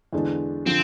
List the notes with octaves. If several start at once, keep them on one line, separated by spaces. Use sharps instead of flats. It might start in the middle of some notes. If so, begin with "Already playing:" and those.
E2 D3 G#3 D4
D3 F3 C4